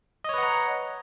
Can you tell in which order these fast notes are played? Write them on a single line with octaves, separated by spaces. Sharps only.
D#5 C#5 B4 F#5 A#5